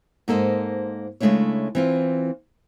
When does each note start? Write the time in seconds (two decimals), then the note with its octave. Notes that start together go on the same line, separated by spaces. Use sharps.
0.28 G#2 A#3 A4 C5 D#5
1.20 C#3 G#3 A3 D4 E4 C#5
1.75 E3 C4 F4